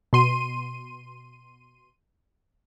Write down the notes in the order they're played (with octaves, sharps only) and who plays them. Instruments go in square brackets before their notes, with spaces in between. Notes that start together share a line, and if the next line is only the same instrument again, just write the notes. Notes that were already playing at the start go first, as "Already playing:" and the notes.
[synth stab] B2 C6 D#7